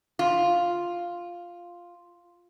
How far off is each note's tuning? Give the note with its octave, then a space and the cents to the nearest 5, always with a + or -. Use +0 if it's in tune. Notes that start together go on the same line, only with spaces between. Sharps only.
F4 +0